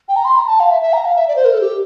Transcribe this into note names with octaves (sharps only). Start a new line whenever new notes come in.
G5
A#5
C6
A#5
A5
F5
E5
E5
A#5
F5
E5
D5
C5
A#4
A4
G4